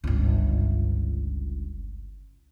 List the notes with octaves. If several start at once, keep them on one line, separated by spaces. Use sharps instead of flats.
G1 C#2